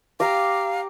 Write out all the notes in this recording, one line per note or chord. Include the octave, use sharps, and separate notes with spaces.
G4 F5 A#5 D6